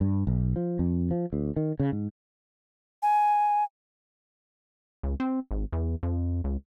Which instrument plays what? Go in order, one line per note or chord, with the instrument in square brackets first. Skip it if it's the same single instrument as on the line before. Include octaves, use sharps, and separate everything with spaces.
[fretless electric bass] G2
B1
F3
F2
F3
D2
D#3
C#3
G#2
[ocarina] G#5
[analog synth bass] C#2
C4
G#1
E2
F2
C#2